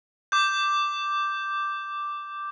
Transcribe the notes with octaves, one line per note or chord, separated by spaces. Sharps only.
D6 G6